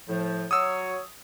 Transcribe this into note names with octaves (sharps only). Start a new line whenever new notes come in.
A2 F3
F#3 C#5 D#6 E6